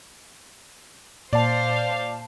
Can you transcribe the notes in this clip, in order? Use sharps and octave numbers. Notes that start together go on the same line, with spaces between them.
A#2 C5 D5 F5 A5